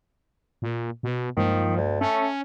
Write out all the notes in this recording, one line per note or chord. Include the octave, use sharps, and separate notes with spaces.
A#2
B2
G2 D#3 F3 G#3 A#3
D2
A3 C#4